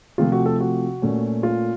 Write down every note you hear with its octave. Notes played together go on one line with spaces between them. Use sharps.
C3 F3 A3 F4
F#4
A4
F#4
A#2 A3 C#4
F4